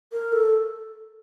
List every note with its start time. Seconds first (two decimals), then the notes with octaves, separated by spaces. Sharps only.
0.12 A#4
0.33 A4